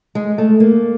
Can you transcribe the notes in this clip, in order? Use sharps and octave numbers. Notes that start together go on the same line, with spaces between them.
G#3
A3
A#3